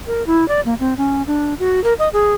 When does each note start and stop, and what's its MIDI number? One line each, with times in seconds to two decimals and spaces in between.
0.07 0.24 70
0.27 0.47 64
0.48 0.61 74
0.65 0.75 58
0.80 0.94 60
0.98 1.23 61
1.27 1.54 62
1.59 1.82 66
1.84 1.94 70
1.99 2.08 75
2.13 2.35 68